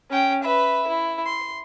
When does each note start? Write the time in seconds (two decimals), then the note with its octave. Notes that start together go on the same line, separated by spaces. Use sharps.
0.10 C#4 G5
0.43 B4 E5
0.87 E4
1.25 C6